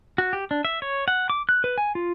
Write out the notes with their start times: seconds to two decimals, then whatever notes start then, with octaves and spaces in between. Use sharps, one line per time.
0.18 F#4
0.33 G4
0.51 D4
0.65 E5
0.82 C#5
1.08 F#5
1.30 D6
1.49 F#6
1.64 B4
1.78 G#5
1.95 F4